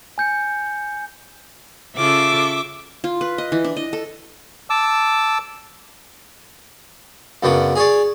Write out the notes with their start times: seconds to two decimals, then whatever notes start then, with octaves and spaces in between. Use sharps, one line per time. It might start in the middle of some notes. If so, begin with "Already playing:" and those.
0.18 G#5 G6 C#7
1.96 C#3 F4 A4 E5 D6
3.04 F4
3.21 B4
3.38 D#5
3.52 E3
3.64 D4
3.77 D#5
3.93 A4
4.70 A5 D6 E6
7.43 F#2 C#3 B3 D4
7.76 G#4 C#5 D5